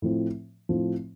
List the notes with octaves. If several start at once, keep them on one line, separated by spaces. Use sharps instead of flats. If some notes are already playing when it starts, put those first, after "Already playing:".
A2 F3 C4
A2 F3 C4